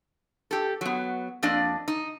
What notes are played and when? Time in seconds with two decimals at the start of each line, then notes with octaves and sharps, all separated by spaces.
0.51 G4 A4
0.81 F#3 B3
1.43 F2 A#3 D4 D5 D#5
1.88 D#4